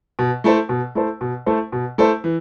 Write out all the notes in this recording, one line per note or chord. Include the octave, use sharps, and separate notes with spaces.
B2
A3 E4 A4 C5
B2
A3 E4 A4 C5
B2
A3 E4 A4 C5
B2
A3 E4 A4 C5
E3